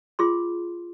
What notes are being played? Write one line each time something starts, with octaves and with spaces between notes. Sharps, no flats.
F4 G#4 C6